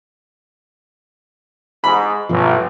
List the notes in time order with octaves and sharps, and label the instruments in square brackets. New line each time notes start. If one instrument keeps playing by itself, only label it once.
[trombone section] G#2 [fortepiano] B5
[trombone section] A1 [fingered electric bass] G2 B2 F3